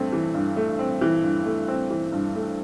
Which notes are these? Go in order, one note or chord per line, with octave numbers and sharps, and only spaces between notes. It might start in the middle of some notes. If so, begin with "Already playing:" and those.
Already playing: G2 A3 C4
E3
G2
A3
C4
E3
G2
A3
C4
E3
G2
A3